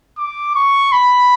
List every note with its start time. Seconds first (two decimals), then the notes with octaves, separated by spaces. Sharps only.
0.18 D6
0.55 C#6
0.92 B5